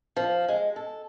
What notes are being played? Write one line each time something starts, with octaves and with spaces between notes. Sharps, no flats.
F3
G#3
A4